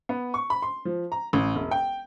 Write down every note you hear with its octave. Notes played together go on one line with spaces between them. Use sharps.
B3
C#6
B5
C6
F3
A#5
A1
E1
G5